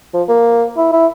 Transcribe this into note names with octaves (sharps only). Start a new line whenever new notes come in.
F3
A#3
E4
E4